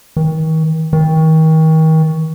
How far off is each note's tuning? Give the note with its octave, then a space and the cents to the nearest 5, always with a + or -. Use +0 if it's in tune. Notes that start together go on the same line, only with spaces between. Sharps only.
D#3 +40
D#3 +35